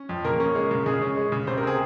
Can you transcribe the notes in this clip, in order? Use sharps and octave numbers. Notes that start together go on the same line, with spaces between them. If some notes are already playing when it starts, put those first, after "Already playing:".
Already playing: C#4
F2
C#3 A#3 A#4
C#4
G#3
C#3
C#3 G#3 G#4
C#4
G#3
C#3
C3 C5
A#4
C4 G#4